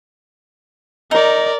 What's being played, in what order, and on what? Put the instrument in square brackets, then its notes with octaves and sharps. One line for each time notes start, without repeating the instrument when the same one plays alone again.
[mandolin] D#4 [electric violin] A#4 D5